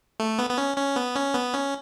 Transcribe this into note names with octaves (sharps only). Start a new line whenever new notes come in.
A3
B3
B3
C#4
C#4
B3
C#4
B3
C#4